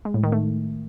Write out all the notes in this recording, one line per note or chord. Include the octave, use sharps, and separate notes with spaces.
G#3
A2
D#3
A3